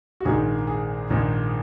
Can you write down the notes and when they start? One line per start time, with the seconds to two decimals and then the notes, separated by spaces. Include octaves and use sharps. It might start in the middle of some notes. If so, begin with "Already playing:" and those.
0.20 F#4
0.25 A#1 G#2 D#3 G#4
0.67 G#4
1.10 A#1 G#2 D#3